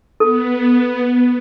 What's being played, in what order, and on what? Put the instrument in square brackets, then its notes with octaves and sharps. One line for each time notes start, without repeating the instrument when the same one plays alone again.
[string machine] B3 [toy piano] A4